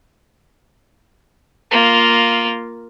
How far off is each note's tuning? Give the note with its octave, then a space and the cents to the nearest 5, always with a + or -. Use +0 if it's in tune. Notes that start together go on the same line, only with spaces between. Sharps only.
A#3 +0 F4 +0